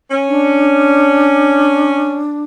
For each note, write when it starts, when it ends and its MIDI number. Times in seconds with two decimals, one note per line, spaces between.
0.11 2.21 61
0.28 2.44 62